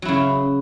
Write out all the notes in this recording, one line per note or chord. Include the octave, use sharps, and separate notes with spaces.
C#3 F#3 E4